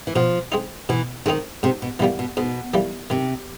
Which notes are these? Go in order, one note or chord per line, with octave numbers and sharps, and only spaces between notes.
E3
B2 F3
G#3 C4 D#4
B2 E3
D#3 G#3 C4 D#4
G#2 C3
B2
B2 E3 G3 A#3
B2
G#2 B2
E3 G3 A#3
C3 D#3